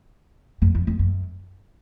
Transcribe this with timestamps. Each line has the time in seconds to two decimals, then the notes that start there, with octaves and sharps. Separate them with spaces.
0.62 F#2
0.75 E2
0.87 F2
0.99 F#2